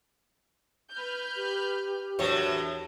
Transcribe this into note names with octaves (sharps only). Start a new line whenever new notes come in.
B4 F6 G6
G4
E2 A2 F#3 D4 A#4 C#5